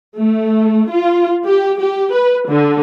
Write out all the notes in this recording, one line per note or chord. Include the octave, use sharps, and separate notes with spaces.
A3
F4
G4
G4
B4
D3